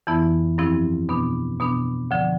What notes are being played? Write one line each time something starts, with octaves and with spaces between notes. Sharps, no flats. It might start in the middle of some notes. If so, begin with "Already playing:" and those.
F2 E3 B3 E4
G2 F3 C4 E4
B2 B3 D4
B2 B3 D4
D2 D3 F3